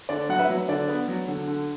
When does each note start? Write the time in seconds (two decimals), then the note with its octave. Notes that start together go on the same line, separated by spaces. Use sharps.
0.09 D3 D5
0.29 F#3 F#5
0.39 B4 E5
0.49 F#3
0.68 D3 D5
0.88 B3
1.08 F#3
1.28 D3
1.48 D3